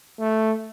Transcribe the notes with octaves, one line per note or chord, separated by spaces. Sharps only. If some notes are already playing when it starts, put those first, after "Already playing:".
A3